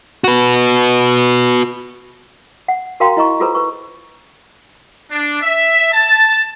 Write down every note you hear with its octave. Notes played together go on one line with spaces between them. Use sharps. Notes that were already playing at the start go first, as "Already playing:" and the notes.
F#4 B4
F#5
F#4 A#4 F5 G5 A#5 C6
E4 D#5 A#5 C#6
F4 G#4 A4 B4 C5 A#5
B4 C#6
D4
E5
A5